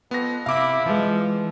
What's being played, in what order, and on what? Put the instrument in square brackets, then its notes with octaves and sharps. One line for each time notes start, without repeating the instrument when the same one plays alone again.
[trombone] F2 [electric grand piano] B3 A#6
[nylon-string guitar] C3 [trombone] E4 [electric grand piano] F5 D6
[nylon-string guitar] E3 G#3 [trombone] F3